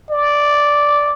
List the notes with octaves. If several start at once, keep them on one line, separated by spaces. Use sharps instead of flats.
D5